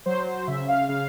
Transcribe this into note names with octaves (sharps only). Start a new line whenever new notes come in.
F#3 C5
C5
C#3 E5
F5
C#3 F5